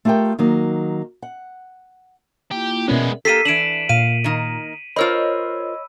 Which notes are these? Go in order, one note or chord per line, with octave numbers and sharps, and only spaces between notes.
A3 F4 G4 A#4 G5
D#3 F#3 A#3 D#4
F#5
A#3 E4 F4 G4
B2 G#3 B3 C#4 A#4 D5 E5
A#3 G4 A4 B6 C7 D#7
E3 D4 D7 E7 F#7
A#2 F5 D#7
D#3 A#3 D#4
F4 A#4 C5 C#5 D#5 B5 E6